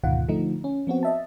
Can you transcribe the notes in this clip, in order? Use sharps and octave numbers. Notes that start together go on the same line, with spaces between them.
D2 G#2 B2 D#3 F4 F#5
D3 F3 A3 D#4
C#4
F3 B3 C4 F#4
D#5 E5 A5